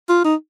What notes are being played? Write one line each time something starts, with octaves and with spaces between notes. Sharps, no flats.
F4
D#4